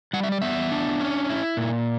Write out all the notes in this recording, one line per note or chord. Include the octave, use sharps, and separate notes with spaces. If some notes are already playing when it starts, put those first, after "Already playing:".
G3 F#5
E5
D5
B3 E5
D4
C#4
E4
A#2